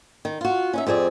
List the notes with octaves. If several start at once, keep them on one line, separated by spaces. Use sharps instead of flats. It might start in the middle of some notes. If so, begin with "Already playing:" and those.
D#3
F4 F#4
C#4 D#4 E5
F2 C4 G#4 D5